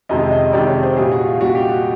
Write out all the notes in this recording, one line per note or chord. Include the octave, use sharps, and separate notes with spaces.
F2 C3 D#3 G#3 D#5
D#5
F2 C3 D#3 G#3 D5
C#5
C5
A#2 G3 G#4
F#4
F4
A#2 G3 F#4
G4
F#4